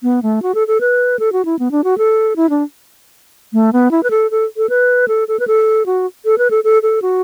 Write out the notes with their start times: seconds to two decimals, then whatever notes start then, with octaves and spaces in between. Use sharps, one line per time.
0.03 B3
0.23 A3
0.42 F#4
0.55 A4
0.68 A4
0.81 B4
1.19 A4
1.32 F#4
1.45 E4
1.59 B3
1.71 D4
1.84 F#4
1.98 A4
2.36 E4
2.50 D4
3.53 A3
3.73 B3
3.91 E4
4.03 B4
4.10 A4
4.31 A4
4.57 A4
4.69 B4
5.08 A4
5.28 A4
5.40 B4
5.48 A4
5.86 F#4
6.25 A4
6.38 B4
6.51 A4
6.64 A4
6.83 A4
7.02 F#4